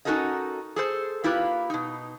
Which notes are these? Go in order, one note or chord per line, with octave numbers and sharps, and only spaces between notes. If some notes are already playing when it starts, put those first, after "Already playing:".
C#4 D#4 F#4 A4 A#4 D#5
G#4 A4 C5
A#3 E4 F4 G4 B4
B2 D#4